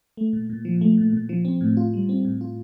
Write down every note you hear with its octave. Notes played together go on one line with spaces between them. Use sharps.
A3
A#2
A#2
F3
A3
A#2
A#2
F3
C4
A2
F4
G3
C4
A2
F4